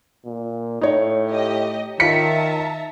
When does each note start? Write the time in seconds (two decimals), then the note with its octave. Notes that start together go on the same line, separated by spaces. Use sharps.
0.25 A#2
0.81 A2 D#4 C#5
1.28 G4 D#5
2.00 D#3 F4 E5 A5 A#5 B6 C#7